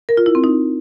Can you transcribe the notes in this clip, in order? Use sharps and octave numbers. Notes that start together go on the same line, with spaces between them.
A#4
F4
E4
C4
D#4